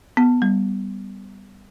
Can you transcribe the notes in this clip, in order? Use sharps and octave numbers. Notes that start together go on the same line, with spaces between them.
B3
G3